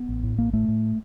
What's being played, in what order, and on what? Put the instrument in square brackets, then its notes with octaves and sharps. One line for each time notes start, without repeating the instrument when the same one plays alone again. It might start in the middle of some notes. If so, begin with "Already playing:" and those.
Already playing: [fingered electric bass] B3
A1
A2
A1 A#3
A2 A3
A2